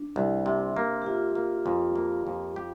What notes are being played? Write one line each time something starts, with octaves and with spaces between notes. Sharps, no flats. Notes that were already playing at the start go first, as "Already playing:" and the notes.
Already playing: D4
C2
C3
A#3
G4
C3 F4
A#3
F2
A#3
F2
G4